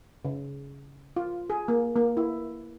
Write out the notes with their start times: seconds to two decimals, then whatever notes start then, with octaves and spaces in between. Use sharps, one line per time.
0.25 C#3
1.16 F4
1.50 G#4
1.68 A#3
1.96 A#3
2.17 E4